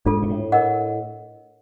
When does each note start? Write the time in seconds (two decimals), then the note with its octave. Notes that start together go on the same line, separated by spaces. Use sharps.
0.06 G#2 D4 F4 A4
0.22 A#2
0.29 A2
0.52 A#4 D#5 F#5